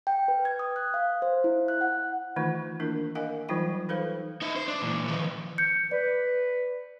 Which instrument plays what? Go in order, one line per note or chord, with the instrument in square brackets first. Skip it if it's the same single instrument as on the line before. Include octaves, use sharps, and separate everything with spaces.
[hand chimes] G5
B4
G#6
D#6
F#6
F5
C5
E4
F#6
F#5
[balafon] D#3 E3 A3 D#4 F4
A#3 D4 E4 A#4
A#4 D#5 F5 F#5 G#5
E3 F#3 G3 D#4 F4 G5
D#4 A4 B4 C5 F5
[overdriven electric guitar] D#4 E5
C5
D4
A#2 E3
D#3 F3
[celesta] G6 C#7
[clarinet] B4 [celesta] D5